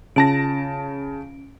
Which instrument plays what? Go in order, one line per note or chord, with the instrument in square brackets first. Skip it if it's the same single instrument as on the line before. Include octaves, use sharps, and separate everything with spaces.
[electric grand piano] C#3 A5 A#6 [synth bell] C#4 D7